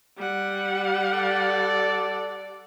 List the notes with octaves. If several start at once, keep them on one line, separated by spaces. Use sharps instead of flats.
G3 F#5
A4 D5